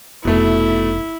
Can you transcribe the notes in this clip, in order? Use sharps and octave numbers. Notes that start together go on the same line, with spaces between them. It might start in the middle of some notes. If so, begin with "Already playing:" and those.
F1 B2 A3 E4